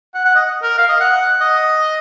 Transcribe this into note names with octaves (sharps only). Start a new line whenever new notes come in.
F#5
F#5
D#5
A#4
F5
D#5
F#5
D#5